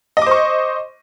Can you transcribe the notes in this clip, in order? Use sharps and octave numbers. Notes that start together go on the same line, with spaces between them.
C5 D#5 C#6 D6